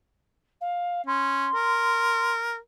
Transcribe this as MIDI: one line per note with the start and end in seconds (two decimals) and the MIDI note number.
0.60 1.01 77
1.07 1.47 61
1.07 2.32 84
1.55 2.57 70